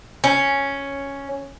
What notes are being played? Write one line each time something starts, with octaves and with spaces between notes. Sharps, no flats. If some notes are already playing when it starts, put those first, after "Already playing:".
C#4